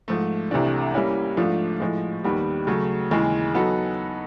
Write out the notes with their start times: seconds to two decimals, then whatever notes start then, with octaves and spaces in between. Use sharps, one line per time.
0.08 G#2 F3 A3
0.51 C2 C3 E3 A3 D4
0.94 G3 A#3 C#4 E4
1.37 G#2 F3 A3 D4 F4
1.80 A2 F3 G#3
2.24 D#2 D#3 G3 B3
2.67 C#3 F#3 A3
3.11 D#2 C#3 E3 G#3
3.54 F#3 B3 D#4 F#4 A4